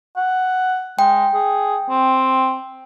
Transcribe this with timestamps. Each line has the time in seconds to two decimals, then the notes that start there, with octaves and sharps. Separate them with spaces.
0.17 F#5
0.99 G#3 G5
1.34 G#4
1.90 C4